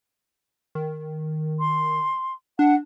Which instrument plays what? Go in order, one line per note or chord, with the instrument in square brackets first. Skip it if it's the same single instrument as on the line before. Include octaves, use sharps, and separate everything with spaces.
[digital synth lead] D#3
[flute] C6
[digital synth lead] D4 [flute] F#5